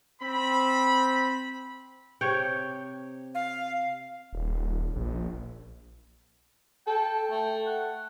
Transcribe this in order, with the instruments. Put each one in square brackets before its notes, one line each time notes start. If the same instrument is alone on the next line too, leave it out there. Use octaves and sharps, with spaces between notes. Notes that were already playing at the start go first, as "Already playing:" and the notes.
[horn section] C4 B5
[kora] C3 C#5 G5
[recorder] F5
[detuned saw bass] D#1
A#1
[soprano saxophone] A4 [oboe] G5
[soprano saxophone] A3
[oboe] F#5